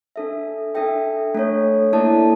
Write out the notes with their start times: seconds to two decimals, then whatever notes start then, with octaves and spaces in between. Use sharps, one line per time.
0.16 D4 A4 E5
0.75 D4 A4 E5 G5
1.34 A3 D4 A4 C#5
1.93 A#3 E4 A4 D5 A5